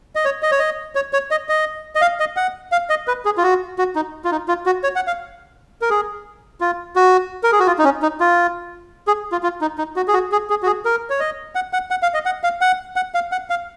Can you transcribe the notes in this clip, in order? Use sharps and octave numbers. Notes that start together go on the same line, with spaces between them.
D#5
C#5
D#5
C#5
D#5
C#5
C#5
D#5
D#5
D#5
F5
D#5
F#5
F5
D#5
B4
G#4
F4
F#4
F#4
D#4
F4
D#4
F4
F#4
C#5
F#5
F5
A#4
G#4
F4
F#4
A#4
G#4
F#4
F4
D#4
C#4
D#4
F4
G#4
F4
F4
D#4
D#4
F#4
G#4
F#4
G#4
G#4
F#4
G#4
A#4
C#5
D#5
F#5
F#5
F#5
F5
D#5
F#5
F5
F#5
F#5
F5
F#5
F5